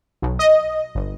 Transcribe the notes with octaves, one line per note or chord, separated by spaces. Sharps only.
B1
D#5
G1